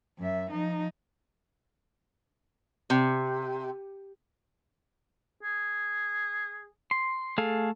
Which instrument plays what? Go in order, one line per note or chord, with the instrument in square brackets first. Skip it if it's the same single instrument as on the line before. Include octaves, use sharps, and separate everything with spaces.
[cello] F#2 E5
F3 D#4
[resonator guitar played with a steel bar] C3
[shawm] G#4
[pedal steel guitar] C6
A3 G#4 A4 F5